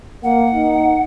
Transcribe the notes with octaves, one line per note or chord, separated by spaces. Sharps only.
A#3 F#5
D#4